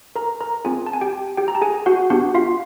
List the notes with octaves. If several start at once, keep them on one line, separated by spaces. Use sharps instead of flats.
A#4 A#5
A#4 A#5
C4 F4 G#4 G#5
A5
G#5
G4 G5
G4 G5
A#5
A5
G#4 G#5
F#4 F#5
B3 D4 F#4 G4 F#5
F4 F5